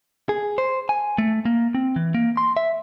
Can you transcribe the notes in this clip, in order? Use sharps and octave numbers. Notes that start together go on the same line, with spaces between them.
G#4
C5
G#5
A3
A#3
C4
E3
A#3
C6
E5